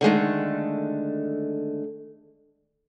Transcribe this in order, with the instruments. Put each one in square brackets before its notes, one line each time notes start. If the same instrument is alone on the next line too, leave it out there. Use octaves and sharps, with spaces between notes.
[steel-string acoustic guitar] D3 D#3 G#3 A3